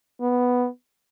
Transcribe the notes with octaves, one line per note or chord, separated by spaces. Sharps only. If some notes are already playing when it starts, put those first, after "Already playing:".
B3